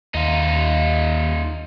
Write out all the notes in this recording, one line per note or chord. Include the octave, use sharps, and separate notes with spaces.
D#2 D#4 F4